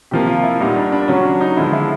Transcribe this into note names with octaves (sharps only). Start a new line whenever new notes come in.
C3 F3 A#3 G4
F4
E4
A#2 G3 B3 D#4
D4
D4
C#3 F#3 B3 C#4
D4
D#4
D3 F3 G#3 B3 E4
E4